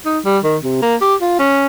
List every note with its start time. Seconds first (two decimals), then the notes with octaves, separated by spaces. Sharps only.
0.06 D#4
0.25 G3
0.44 D#3
0.64 C3
0.82 A#3
1.01 G4
1.21 F4
1.39 C#4